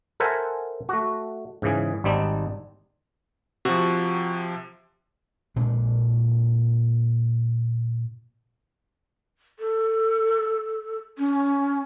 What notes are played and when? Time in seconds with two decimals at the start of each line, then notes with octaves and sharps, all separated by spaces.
0.20 A4 A#4 C5 E5 F#5 G#5
0.89 A3 F#4
1.62 G#2 C#3 E3 G#4
2.04 G#1 G3 C4 D4 D#4
3.65 C3 F3 F#4
5.56 A#2 G#3 D4
9.59 A4
11.18 C#4